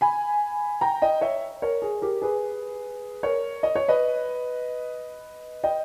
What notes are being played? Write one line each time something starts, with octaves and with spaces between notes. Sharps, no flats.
G#5 B5
G5 A#5
D#5 G5
C#5 E5
A#4 C#5
G#4
G4 A#4
G#4 B4
A#4 C#5
D#5
C#5
B4 D#5
D#5 G5